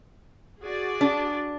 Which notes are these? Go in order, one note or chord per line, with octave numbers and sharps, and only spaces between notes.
F#4 G#4 D5
D4